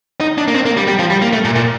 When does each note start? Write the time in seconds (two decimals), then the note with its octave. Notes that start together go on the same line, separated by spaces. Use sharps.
0.21 D#4
0.38 D4
0.48 A#3
0.54 C4
0.66 A#3
0.77 G3
0.88 G3
0.99 F3
1.10 G3
1.22 A#3
1.33 A3
1.45 A#2
1.55 A#2